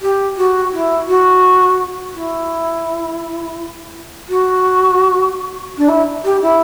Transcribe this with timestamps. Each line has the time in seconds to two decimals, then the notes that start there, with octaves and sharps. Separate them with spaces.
0.01 G4
0.37 F#4
0.72 E4
1.08 F#4
2.14 E4
4.28 F#4
5.77 D4
5.88 E4
6.24 G4
6.41 E4